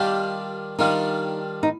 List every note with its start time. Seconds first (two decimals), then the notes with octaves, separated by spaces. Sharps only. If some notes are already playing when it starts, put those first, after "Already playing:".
Already playing: D#3 G3 D4 F4 G4
0.79 D#3 G3 D4 D#4 F4
1.63 D#4